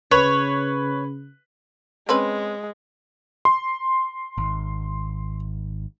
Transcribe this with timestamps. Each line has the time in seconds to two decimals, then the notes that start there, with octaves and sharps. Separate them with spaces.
0.11 C#3 B4 C#5
2.09 G#3 C4 C#4 B4 C6
3.45 C6
4.38 G#1